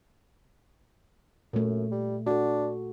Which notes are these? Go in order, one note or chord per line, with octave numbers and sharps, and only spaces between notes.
F#2 A#2 A3
G3
D4 F#4 A4